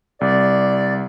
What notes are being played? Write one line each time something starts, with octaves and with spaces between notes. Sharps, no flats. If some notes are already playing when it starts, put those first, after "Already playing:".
C2 D5